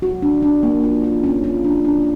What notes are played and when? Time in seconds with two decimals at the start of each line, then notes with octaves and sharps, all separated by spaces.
0.02 F#4
0.22 D4
0.43 D4
0.63 A#3
0.84 F4
1.04 F4
1.23 C#4
1.44 F4
1.64 D4
1.85 D4